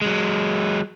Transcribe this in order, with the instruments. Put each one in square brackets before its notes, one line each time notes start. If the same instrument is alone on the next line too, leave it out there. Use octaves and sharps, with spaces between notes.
[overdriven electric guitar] F#3 G#3